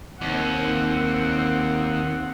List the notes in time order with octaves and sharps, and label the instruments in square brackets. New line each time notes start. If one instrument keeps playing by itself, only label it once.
[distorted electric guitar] D#2 [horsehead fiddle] C4 F#5